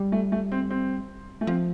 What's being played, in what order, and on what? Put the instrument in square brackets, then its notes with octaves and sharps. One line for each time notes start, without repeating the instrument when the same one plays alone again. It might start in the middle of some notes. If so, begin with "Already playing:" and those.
Already playing: [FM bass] G3
[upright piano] A3
A3
C4
C4
A3
[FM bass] F3 [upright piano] C4